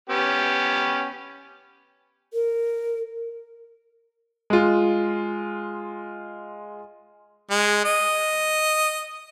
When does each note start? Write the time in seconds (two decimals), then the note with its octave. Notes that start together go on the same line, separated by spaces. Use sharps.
0.09 B3 C#4 G4
2.34 A#4
4.50 G#3 F4
7.50 G#3
7.84 D#5